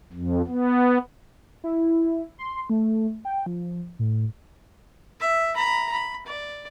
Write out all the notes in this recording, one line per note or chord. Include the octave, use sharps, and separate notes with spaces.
F2
B3
E4
C6
A3
G5
F3
A2
E5
A#5 B5
B5
D5